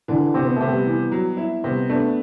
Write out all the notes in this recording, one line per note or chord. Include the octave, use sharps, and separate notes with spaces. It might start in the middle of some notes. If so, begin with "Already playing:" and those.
D3 E3
C3 C4
B3
C3 A3
G3 B3
E3
F#3
E4
C3 G3 B3
A3 B3 D4